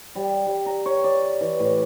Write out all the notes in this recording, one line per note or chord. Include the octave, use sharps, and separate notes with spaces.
G3
G3
A#5
C#5
D5
E3
A2